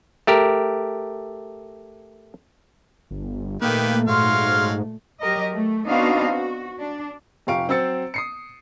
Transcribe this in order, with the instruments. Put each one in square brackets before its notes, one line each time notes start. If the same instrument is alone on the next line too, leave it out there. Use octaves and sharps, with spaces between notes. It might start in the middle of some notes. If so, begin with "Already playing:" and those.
[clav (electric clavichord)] A3 G4 A#4
[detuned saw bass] G1
[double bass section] A#2 A3 [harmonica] D#3 G4 B4 [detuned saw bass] A#3
[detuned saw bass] G#2 [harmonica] F#3 F5 [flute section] C6 F6
[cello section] F#3 G4 A#4 D#5
A3
B3 C4 D4 D#4 F#4 F5
F#4
D4
[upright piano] F1 F3 G4 F5 C#6 D7
F#3 C4 C5 E6 A6 C#7
D#6 C7 C#7